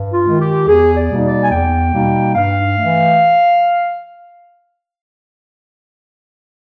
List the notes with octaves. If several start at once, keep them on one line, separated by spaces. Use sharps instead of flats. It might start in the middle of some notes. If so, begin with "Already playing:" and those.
Already playing: G2
F4
D#3 G#3
G4
E2 G#4
D5
B2 G3 A#3 D#4
D5
G#5
E2 G5
B2 G3 A#3 D#4
G2 F5
E3 A3